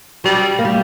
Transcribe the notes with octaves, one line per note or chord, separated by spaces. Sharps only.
F#3 G3
A#3
G3